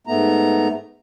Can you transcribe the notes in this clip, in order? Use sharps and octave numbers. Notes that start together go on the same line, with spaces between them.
G#2 A3 B3 A#5